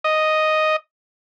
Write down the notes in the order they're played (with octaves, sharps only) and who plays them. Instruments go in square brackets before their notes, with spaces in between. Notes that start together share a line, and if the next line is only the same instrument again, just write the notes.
[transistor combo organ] D#5